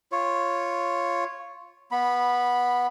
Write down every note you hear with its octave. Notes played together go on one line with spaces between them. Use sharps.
F4 C#5
B3 B5